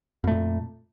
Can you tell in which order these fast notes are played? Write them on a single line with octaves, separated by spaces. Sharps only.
F2 A3 A#2